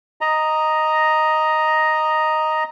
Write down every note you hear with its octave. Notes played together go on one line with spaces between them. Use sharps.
D#5 A#5